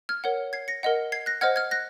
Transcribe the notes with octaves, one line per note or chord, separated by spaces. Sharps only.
F6 G#6
A#4 C#5 F#5
G#6 C7
A#6 C#7
A#4 D#5 F#5
G#6 C7
F#6 A#6
C5 D#5 F#5 F6 G#6
F6 G#6
F#6 A#6